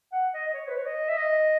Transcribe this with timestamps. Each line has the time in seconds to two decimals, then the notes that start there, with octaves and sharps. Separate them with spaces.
0.12 F#5
0.34 D#5
0.47 D#5
0.54 C#5
0.68 B4
0.77 C#5
0.86 D#5
1.08 E5
1.17 D#5